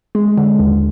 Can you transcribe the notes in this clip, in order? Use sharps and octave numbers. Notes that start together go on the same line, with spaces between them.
G#3
D3
D#2